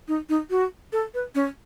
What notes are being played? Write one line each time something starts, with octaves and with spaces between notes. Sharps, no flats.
D#4
D#4
F#4
A4
B4
C#4